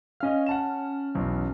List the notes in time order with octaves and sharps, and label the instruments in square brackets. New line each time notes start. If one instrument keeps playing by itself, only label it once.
[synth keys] C#4 F6 [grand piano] D#5 F5
[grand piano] F#5 A5 E7
B1 E2